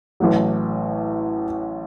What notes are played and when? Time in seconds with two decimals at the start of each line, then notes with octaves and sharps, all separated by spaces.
0.20 A1 A2 F#3